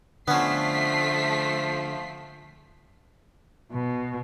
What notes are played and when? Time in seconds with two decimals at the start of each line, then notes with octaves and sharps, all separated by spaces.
0.28 D3 F3 A3 B3 C#4 B6 C7
3.72 B2